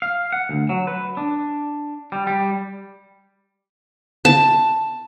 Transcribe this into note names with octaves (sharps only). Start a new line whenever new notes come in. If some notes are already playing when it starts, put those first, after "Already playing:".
F5
F#5
D2
F#3
B4
D4
G3
G3
A5